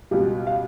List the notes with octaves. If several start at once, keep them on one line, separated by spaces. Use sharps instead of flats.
C#2 B2 G3
F5